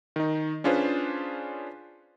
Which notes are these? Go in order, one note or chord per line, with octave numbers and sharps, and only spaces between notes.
D#3 D#4
C#4 D4 F4 G#4 B4 C5